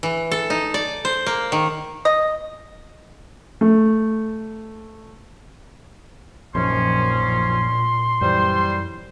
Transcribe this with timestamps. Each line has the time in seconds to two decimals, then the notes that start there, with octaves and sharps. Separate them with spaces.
0.03 E3
0.31 A4
0.50 D#4
0.74 D5
1.05 C5
1.26 A#3
1.52 D#3
2.05 D#5
3.61 A3
6.55 A#1 F#2 A#2 D#3 F3 C#4 C6
8.21 F#2 E3 G3 C5